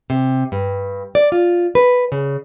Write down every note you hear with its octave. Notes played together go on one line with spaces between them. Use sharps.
C3
G2
D5
F4
B4
C#3